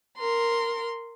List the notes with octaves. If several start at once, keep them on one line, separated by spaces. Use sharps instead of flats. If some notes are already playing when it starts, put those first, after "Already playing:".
A#4 C6